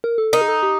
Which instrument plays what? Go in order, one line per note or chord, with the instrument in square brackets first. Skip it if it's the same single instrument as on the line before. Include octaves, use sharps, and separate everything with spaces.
[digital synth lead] A#4
A4
[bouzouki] D#4 [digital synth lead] A#4
[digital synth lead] G#4
A4
G4